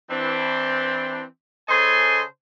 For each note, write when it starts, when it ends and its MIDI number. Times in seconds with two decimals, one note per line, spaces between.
0.11 1.23 52
0.11 1.23 60
0.11 1.23 62
1.69 2.22 49
1.69 2.22 69
1.69 2.22 72
1.69 2.22 75
1.69 2.22 80
1.69 2.22 84